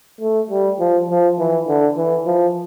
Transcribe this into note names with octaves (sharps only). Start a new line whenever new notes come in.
A3
G3
F3
F3
E3
D3
E3
F3